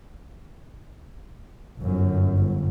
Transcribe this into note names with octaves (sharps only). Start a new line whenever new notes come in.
G1 F#2
G1